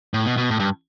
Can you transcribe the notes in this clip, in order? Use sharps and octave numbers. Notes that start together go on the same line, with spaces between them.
A2
B2
B2
A2
G2